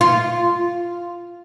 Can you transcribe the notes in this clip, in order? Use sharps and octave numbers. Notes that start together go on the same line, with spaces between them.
F4